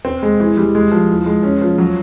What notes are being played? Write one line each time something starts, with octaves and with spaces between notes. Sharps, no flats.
C4
G#3
E3
G3
G#3
F3
E3
G#3
C#4
F3
F#3